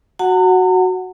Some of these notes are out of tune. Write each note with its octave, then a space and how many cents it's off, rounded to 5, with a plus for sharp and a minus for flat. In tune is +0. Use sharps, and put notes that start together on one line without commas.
F#4 +0 F#5 +0 A#5 -45